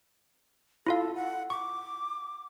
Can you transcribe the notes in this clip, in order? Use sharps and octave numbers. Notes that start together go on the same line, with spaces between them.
E4 F4 A4 F5
F#5
C#6 D6